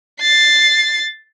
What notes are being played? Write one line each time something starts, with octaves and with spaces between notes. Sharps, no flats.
A6 C7